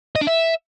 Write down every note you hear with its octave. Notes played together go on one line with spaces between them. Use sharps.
D#5
D4
E5